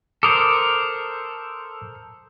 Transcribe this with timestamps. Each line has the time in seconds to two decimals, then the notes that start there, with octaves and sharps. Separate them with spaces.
0.23 A4 A#4 C5 D6 D#6